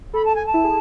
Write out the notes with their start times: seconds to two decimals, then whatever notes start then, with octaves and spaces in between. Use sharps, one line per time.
0.14 A4 B5
0.25 A5
0.35 G#5
0.46 A5
0.54 E4
0.64 G#4